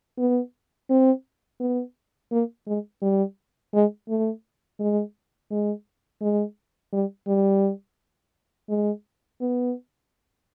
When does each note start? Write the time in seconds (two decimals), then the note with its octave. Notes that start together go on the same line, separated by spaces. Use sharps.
0.18 B3
0.90 C4
1.60 B3
2.31 A#3
2.67 G#3
3.01 G3
3.73 G#3
4.09 A3
4.79 G#3
5.50 G#3
6.21 G#3
6.93 G3
7.27 G3
8.69 G#3
9.41 B3